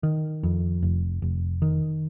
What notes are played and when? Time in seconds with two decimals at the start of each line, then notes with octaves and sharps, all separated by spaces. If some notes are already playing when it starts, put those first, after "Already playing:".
0.03 D#3
0.43 F2
0.83 F1
1.22 F1
1.62 D#3